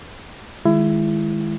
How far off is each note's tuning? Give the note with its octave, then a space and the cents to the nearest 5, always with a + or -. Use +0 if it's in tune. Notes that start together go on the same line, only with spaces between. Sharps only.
D#3 +5 G#3 +5 E4 +25